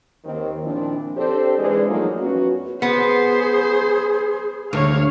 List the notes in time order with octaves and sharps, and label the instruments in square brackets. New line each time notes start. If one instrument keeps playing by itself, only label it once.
[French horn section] D#2 D#3 C4
A#2 D#3 F3 C4 D4 E4
C4 D4 G4 A4 C5
G#2 E3 G#3 D4 G#4 D5
F3 F#3 A3 A#3 D#4 F4
F#2 B3 C#4 F#4
[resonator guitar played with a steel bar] B3 [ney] G#4 [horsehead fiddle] C5
[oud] D2 [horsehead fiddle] C#5 F5